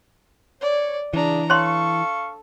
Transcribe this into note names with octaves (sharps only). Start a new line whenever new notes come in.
C#5 D5
C#3 E3 D4 A#5
A4 C#5 F5 C6 C#6